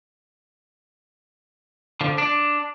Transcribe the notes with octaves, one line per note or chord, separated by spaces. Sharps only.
D3 F3
D4